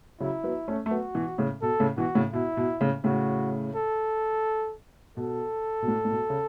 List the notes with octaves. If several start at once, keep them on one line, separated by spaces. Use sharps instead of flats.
C#3 F#3 E4
F#3 B3
A3 C#4
A3
F#3 B3 F#4
B2 E3
A2 C#3
B2 A4
A2 C#3
B2 E3 F#4
A2 C#3
B2 E4
B2
A2 C#3
A2 C#3 F#4
A4
B2 A4
B2
A2
A2
B2
C#3